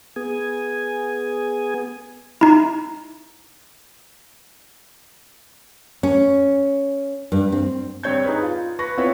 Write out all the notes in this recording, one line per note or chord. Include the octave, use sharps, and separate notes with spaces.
B3 G#4 G#5
D#4 E4
C#4
G2
C4
G2 C4 C#5 G6 G#6
D#4 G#4 B4
F4
B4 C#6 A#6
B3 C4 E4 F4 B4 C#5